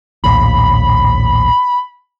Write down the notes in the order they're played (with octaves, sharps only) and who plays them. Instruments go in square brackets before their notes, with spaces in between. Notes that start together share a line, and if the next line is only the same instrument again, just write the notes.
[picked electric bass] A#1 D#2 A2 [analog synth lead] B5